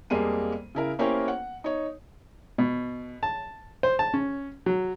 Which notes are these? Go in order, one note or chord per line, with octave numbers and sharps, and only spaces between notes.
F2 G3 G#3 A#3 D#7
C#3 E4 A#4
A#3 C#4 E4 G4 A#4 C5
F#5
D#4 C#5
B2
A5
C5
A5
C#4
F#3